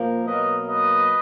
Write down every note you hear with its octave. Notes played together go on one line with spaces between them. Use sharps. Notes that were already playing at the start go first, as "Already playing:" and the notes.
Already playing: A#2 F3 A#3
B2 F#3 A#3 B4 D#5
B4 D#5